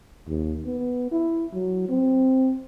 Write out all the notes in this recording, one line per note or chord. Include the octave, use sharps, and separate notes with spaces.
D#2
B3
E4
F#3
C4